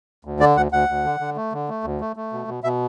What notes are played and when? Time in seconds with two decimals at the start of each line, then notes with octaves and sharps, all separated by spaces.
0.25 D2
0.40 D3 D5
0.56 D2 F#5
0.72 D2 F#5
0.89 D2
1.04 D3
1.20 D3
1.36 A3
1.53 D3
1.69 A3
1.84 D2
2.00 A3
2.16 A3
2.33 B2
2.48 B2
2.63 B2 E5